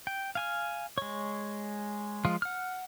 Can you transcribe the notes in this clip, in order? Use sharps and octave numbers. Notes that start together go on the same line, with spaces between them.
G5
F5 G#5 F6
G#3 C#5
F3 G#3 F4
F#5 F6